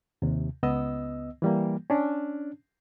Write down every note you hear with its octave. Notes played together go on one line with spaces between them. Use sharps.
D#2 C3
C#2 B3 D#5 E6
E3 G3 A#3
C#4 D4